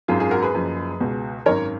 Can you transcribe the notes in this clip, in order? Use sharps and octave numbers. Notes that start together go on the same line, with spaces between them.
G#1 F#2 D#3 F4 G#4
F4 G#4
F#4 A#4
G#4 B4
F#1 F#2 F3
C#2 B2
G#1 F#2 D#3 A#4 C#5